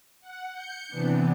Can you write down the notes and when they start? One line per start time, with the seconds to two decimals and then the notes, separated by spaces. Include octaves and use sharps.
0.20 F#5
0.52 G6 C#7
0.88 C3 E3 B3 D4